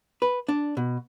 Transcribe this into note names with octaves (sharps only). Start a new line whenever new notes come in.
B4
D4
B2